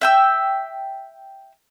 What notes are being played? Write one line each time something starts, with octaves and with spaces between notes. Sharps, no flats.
E5 G5 E6